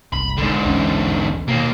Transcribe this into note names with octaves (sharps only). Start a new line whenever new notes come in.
F#1 C2 B5
G#2 D3
A#1 E2 C#4
D#2 B2 A#3